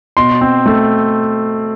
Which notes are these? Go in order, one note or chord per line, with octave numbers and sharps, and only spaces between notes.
B2 C6
C4
A3